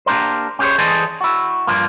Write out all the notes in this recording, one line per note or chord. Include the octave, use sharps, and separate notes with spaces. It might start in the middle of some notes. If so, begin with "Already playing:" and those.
A#3 D4 G4 A#4 C5
C#4 G4 G#4 A#4 C5 C#5
E3 G#4 A4 C5 D5 D#5
E4 F#4
G2 F3 A#3